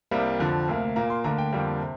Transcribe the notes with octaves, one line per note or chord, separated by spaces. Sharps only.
C2 C3 G3 A#3
F2 D3 F3
D2 C3 A#3
A#2 A#3 A#5
C6
D2 D3 A#3 A#5
G5
F2 D3 G3 A#3
C3